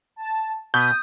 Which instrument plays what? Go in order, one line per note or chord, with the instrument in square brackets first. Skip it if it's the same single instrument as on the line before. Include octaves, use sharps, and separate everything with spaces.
[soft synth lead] A5
[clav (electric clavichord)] B2 B3 [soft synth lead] D#6 [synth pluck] G6